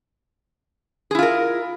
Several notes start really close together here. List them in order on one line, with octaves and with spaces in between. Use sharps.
G#4 E4 F4 A#4